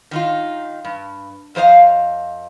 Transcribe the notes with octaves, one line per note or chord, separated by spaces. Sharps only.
D#3 D#4 F4
G2
F2 F3 C5 D#5 F5